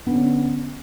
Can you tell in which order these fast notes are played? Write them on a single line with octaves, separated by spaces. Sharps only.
B3 D3 C#4